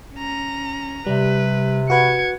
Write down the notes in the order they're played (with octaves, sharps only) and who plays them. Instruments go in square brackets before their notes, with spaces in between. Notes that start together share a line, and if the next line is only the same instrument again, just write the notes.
[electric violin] C#4 A#5
[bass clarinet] C3 [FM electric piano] G3 [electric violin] B4
[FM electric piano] F#4 B4 F#5 [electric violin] G#6 C#7